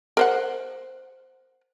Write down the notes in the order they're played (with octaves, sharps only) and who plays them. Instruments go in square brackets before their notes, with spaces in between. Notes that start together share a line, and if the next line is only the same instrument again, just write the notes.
[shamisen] A#4 C5 F#5